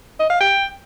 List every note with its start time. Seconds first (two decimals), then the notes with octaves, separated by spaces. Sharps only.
0.20 D#5
0.30 F5
0.40 G5